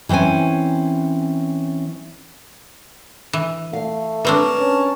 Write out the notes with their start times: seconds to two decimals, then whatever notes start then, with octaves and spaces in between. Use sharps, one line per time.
0.09 E3 C4 C#4 E4 G#5
3.33 E3
3.73 A3 F5
4.25 G3 C4 D4 A#4 B4 C#5 A5
4.60 C#4